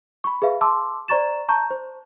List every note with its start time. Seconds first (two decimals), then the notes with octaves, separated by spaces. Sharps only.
0.24 B5 C#6
0.42 G#4 B4 E5 F5
0.61 A5 C6 D6 E6
1.08 C5 D5 A#5 C#6 A6 E7
1.49 A5 A#5 C#6 G6
1.71 C5